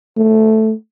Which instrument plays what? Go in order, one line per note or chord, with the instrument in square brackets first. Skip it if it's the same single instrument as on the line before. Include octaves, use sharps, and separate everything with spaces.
[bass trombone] A3